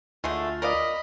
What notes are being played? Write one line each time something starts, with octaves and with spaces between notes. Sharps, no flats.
D2 D3 G#3 A3 F4
A#4 D5 D#5 F5 B5